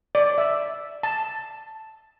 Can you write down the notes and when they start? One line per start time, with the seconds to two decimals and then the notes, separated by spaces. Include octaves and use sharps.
0.15 D5
0.38 E5
1.03 A5